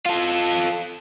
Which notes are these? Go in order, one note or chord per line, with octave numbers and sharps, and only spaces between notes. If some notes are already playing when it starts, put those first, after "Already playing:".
F4 A4